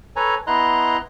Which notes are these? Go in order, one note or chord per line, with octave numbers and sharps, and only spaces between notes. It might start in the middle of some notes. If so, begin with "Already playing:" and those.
A4 B4 C#5 G#5 A#5
B3 E4 D#5 A#5 C6 F#6